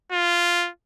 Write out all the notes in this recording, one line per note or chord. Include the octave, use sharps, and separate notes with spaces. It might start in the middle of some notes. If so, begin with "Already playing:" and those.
F4